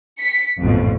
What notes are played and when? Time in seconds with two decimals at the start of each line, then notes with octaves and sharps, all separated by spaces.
0.21 B6 C#7
0.61 A1 F2 G#2 B2